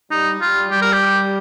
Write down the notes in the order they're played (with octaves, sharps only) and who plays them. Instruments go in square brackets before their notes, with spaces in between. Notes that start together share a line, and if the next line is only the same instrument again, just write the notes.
[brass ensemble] G3 [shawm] D#4
[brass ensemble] G3 [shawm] F4
[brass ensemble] G3 [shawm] G4
[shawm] A#4
G4